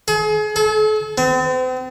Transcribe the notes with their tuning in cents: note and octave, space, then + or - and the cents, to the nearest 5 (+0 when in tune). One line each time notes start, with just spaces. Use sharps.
G#4 +35
A4 -40
C4 -40